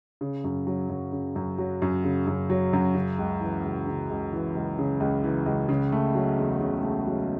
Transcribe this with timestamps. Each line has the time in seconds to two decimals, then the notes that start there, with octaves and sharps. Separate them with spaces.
0.21 C#3
0.44 F#2
0.67 F#3
0.89 F#2
1.12 C#3
1.36 F#2
1.58 F#3
1.82 F#2
2.04 C#3
2.27 F#2
2.50 F#3
2.73 F#2
2.95 C#3
3.19 C#2
3.41 E3
3.64 C#2
3.87 C#3
4.10 C#2
4.33 E3
4.55 C#2
4.78 C#3
5.00 C#2
5.24 E3
5.46 C#2
5.69 C#3
5.92 A3
6.15 F#3
6.38 E2
6.61 C#3
6.83 A3
7.07 F#3